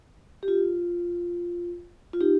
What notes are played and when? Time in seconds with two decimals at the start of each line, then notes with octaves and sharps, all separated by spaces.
0.43 G4
0.48 F4
2.13 F4
2.21 D#4 G4